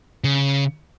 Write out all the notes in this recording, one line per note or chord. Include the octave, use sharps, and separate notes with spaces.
C#3